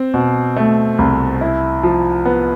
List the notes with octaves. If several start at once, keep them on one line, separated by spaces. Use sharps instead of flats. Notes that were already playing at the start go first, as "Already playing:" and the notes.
Already playing: C4
B2
A3
C2
E4
F3
B3